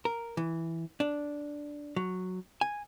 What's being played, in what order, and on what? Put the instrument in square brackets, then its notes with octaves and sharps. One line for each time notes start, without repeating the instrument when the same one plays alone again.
[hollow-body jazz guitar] A#4
E3
D4
F#3
G#5